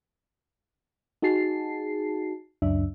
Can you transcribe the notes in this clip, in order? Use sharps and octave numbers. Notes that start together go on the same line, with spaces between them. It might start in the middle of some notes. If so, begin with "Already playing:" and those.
D#4 F#4 G#4 A5 C7
C#2 F#2 D4 E5